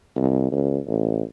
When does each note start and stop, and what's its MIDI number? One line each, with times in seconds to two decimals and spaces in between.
0.16 0.49 36
0.52 0.78 37
0.87 1.22 33